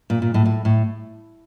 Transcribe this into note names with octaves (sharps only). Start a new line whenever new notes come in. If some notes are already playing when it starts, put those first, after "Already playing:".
A#2
A#2
A2
A2
A2